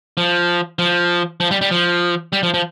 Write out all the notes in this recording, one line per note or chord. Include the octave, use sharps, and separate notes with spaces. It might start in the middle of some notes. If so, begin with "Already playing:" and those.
F3
F3
F3
G3
G3
F3
G3
F3
F3